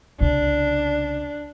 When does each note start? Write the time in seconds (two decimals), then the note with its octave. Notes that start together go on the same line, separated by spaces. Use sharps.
0.21 C2 C#3 D4